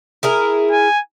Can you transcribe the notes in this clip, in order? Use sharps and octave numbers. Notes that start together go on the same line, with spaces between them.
E4 G#4 A#4
G#5